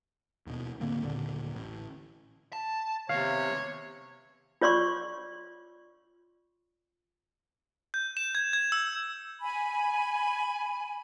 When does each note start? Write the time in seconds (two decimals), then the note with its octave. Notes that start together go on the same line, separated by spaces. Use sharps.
0.47 D#2 B2
0.81 A2 D3 A#3 C4
1.03 D#2 A#2 D3
1.55 A1
2.53 A5
3.09 C3 D#3 B3 C#5 F5
4.61 F4 C#5 D5 C6 C#6
7.94 G6
8.17 E7
8.35 G#6
8.53 G#6
8.72 E6
9.41 G#5 B5